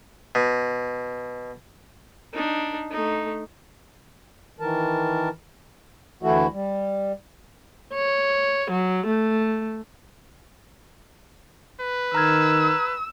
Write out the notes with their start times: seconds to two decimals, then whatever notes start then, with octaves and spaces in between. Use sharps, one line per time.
0.35 B2
2.33 D4 D#4
2.91 A3 D#4
4.60 D#3 E3 A#4 A5
6.23 D2 E3 A3 E4 F#4
6.53 G3
7.94 C#5
8.70 F#3
9.07 A3
11.81 B4
12.15 D#3 A#5 E6 F6 G#6